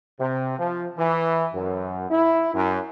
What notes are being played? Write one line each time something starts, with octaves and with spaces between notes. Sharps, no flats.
C3
F3
E3
F#2
E4
F#2